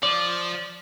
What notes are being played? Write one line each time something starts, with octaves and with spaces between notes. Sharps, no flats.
F3 D5